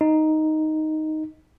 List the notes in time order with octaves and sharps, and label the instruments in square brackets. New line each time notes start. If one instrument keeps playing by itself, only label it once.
[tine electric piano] D#4